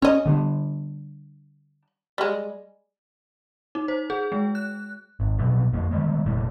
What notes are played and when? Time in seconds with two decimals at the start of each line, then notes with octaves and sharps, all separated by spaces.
0.02 C#4 C#5 D#5
0.26 D3 G3 D4
2.18 G3 G#3
3.75 D#4
3.88 C5
4.10 G#4
4.32 G#3
4.55 F#6
5.20 G#1
5.39 B2 F#3 G3
5.73 F2 A#3
5.91 D#3 G3 G#3
6.25 F1 A#2 A3 A#3